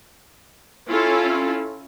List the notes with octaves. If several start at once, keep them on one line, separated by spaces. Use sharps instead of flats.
C#4 E4 F4 A4